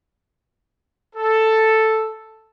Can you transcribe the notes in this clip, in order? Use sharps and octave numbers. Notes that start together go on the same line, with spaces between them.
A4